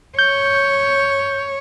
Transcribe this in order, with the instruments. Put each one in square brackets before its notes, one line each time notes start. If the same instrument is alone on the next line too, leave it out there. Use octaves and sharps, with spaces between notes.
[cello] C#5 [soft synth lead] G6